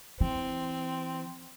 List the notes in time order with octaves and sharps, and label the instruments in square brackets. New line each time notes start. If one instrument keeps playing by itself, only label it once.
[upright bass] E3 [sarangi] C4